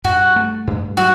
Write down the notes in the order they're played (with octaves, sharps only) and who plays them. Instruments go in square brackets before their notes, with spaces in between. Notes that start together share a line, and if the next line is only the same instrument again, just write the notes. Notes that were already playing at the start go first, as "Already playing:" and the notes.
[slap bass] G2 [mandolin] F#4
[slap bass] A3
G2
[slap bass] F#3 [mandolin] F#4